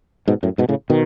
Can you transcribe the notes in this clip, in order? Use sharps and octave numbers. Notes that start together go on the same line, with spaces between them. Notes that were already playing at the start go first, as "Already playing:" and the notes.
G#2 B2
F#2 A2
G#2 B2
A2 C#3
B2 D#3